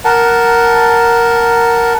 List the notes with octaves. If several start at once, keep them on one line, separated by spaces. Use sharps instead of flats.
A#4 F#5 A5